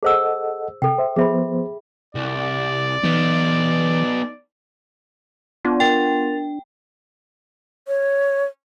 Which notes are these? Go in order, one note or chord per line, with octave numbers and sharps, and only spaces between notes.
G#4 A4 C5 D#5 F#5 E6
C3 A4 G5
C5 E5
F3 B3 G#4 C5 E5 B5
C2 D5
E3 B3 D#4
B3 D4 F4
A#4 G5 A6 F7
C#5